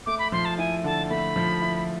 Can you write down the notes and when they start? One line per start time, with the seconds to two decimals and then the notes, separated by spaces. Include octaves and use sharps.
0.06 A3 D6
0.19 B5
0.32 F3 C6
0.45 A5
0.58 E4 G#5
0.84 D3 A5
1.10 A3 B5
1.36 F3
1.62 E4